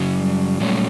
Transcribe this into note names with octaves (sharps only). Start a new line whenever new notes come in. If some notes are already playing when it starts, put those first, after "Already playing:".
Already playing: F#2 C#3 F#3
G3
A#2 F#3 G3 A3 C#4